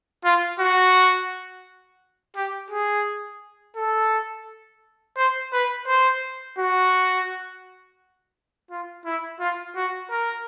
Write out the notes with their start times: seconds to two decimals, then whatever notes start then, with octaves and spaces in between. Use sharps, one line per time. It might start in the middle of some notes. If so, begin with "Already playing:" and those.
0.25 F4
0.60 F#4
2.36 G4
2.71 G#4
3.76 A4
5.17 C5
5.53 B4
5.88 C5
6.58 F#4
8.71 F4
9.05 E4
9.40 F4
9.76 F#4
10.10 A#4